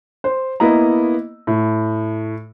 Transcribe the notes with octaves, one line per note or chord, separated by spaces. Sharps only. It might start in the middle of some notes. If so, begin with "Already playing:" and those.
C5
A#3 B3 E4 D#5 A#5
A2